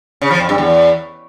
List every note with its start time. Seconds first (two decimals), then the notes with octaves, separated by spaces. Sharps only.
0.22 C#3
0.31 F3
0.40 F2
0.49 G2
0.58 E2